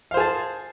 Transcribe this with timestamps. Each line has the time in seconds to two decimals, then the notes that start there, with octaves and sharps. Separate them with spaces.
0.11 F5
0.14 C5
0.17 G#4
0.20 A5